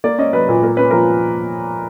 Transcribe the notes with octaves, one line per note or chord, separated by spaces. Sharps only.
A#3 D5
C#4 D#5
F#3 B4
A#2
A#3 A#4
C#4 B4
F3 A#4